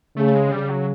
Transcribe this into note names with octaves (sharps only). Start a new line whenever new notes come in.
C#3 A3
G#3
C#3 G3
F#3